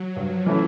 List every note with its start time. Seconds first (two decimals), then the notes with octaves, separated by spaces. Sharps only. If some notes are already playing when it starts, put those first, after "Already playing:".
Already playing: F#3
0.16 G2 F3
0.46 E3 A3 C#4 E4